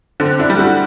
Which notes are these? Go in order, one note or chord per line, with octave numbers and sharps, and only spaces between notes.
D3 C4
D4 E4
G3
E4 F#4